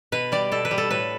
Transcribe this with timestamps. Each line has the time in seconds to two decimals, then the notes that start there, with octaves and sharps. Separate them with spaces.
0.12 B2 B4
0.32 G3 D5
0.52 B2 A4
0.65 B4
0.71 G3
0.78 A4
0.91 A2 B4